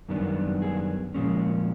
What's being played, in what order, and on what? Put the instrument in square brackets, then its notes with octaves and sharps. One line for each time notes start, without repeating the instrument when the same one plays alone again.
[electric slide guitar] F#2 D#3 G3 B3 D4
G#4
A#2 F3 G#3 C#4